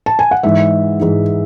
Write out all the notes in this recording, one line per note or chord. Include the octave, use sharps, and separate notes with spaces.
A5
G#5
F#5
G#2 E3 G#3 D#4 E5
G#2 E3 G#3 D#4